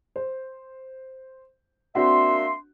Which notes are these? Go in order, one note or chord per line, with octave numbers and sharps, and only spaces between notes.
C5
A#3 C4 D4 F#4 E5 C6